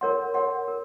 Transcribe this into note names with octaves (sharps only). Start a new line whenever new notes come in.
A#4 C#5 F#5 C6
A#4 C#5 F#5 C6
A#4